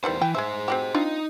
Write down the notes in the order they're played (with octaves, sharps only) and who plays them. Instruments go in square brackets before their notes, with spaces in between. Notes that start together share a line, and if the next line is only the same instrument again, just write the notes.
[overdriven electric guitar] E2 C5 [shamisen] D#3 E3 G3
[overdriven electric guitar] E3 [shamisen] G5
[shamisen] G#3 E5 [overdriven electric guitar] G#4 C5
[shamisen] C4 F#4 G4
[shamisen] C4 D4 F4 [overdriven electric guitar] D#4